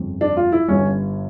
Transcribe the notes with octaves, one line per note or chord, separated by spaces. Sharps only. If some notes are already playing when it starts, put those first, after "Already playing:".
Already playing: G1 F2 C#3
D4
F4
E4
G1 G2 D3 C#4